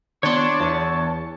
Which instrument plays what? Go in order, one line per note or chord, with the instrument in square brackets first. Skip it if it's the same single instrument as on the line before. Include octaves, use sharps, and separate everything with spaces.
[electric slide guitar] D#3 B3 [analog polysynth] D4 [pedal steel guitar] C#5 C6
[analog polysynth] E2 [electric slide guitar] A5